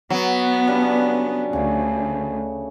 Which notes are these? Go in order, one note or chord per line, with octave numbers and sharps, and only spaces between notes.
F#3 B3
C#3 G3 D4
D2 C#3 A3